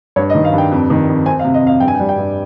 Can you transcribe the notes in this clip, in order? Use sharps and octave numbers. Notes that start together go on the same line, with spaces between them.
G2 C#5
D#5
D#3
F5
G2
G5
F2
D#3
F2
C4 G#5
F5
C3
D#5
F2 F5
G2 G5
G#5
G5
G3
G5
G2